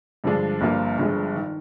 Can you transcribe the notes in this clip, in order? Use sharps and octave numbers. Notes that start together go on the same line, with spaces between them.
G2 D3 F3 G#3 D4
G1 G2 F3 A#3 F4
G1 G2 F3 G#3
D#3